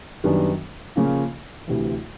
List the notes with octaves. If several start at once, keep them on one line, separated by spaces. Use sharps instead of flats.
F#2 D#3 G3 B3 D4
C#3 F3 A#3 C#4 F4
D2 C3 E3